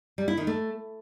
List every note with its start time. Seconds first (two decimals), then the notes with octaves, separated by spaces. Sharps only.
0.18 G3
0.28 E4
0.37 D#3
0.47 A3